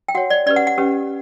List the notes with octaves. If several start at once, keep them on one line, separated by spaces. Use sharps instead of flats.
G5
F#4 C#5 F#5
D5
C#4 G4 B4 D5
F#5
F#5
C#4 G4 B4